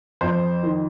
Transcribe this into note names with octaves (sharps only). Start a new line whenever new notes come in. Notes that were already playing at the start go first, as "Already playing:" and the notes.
F2 C5
D#3